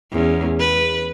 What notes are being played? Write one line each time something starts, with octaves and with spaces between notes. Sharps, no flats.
E2 C#4
B4